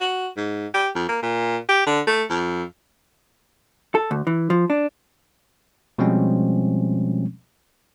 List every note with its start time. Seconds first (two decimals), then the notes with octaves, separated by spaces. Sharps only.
0.01 F#4
0.37 G#2
0.74 G4
0.95 F2
1.09 A#3
1.23 A#2
1.69 G4
1.87 D3
2.07 A3
2.30 F2
3.95 A4
4.11 D2
4.27 E3
4.50 F3
4.70 D4
5.98 B2 F3 G3 G#3 C4 C#4